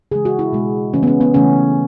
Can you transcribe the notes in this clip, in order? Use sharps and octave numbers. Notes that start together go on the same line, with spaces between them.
C#3 E3 G#3 G#4
F#4
E4
B2 G#3
C#3 E3 A3 C#4
B3
C#4
B3
C#3 E3 A3 C#4